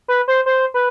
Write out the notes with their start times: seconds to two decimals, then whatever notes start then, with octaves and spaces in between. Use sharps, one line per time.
0.08 B4
0.28 C5
0.46 C5
0.74 B4